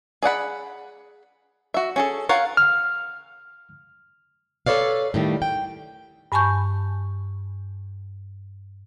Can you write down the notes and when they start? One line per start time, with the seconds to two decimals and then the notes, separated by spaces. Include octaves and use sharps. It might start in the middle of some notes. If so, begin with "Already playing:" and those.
0.23 G#4 D5 F#5 B5
1.74 F#4 E5
1.96 C#4 G#4 A4
2.29 F4 A#4 C#5 F5 F#5
2.57 F6
4.66 A4 B4 C#5 D5 F5
5.14 A2 D#3 G3
5.42 G5
6.32 G2 G#5 A5 B5 C#6 G6